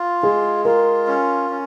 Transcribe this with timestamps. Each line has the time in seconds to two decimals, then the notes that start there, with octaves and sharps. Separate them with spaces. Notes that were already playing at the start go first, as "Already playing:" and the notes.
Already playing: F4
0.23 G#3 G#4
0.65 F4 A#4
1.07 C#4
1.50 C#4